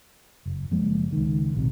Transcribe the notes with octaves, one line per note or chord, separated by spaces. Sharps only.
F#1
F#1 F3 G#3 A#3
C#2 D#3
A#1 C3